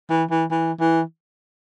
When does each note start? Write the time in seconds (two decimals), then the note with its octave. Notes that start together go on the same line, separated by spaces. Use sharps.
0.10 E3
0.31 E3
0.51 E3
0.80 E3